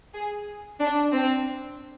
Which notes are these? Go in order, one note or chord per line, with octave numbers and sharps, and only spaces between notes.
G#4
D4
C4